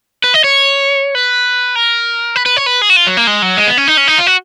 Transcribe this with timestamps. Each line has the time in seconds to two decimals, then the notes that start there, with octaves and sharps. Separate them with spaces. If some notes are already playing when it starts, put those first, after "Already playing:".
0.24 B4
0.34 D#5
0.44 C#5
1.15 B4
1.76 A#4
2.36 B4
2.46 B4
2.57 C#5
2.66 B4
2.82 G#4
2.90 F#4
2.96 F4
3.07 F#3
3.17 A#3
3.27 G#3
3.42 F#3
3.57 G#3
3.67 B3
3.77 C#4
3.88 D#4
3.97 C#4
4.08 D#4
4.18 F4
4.27 F#4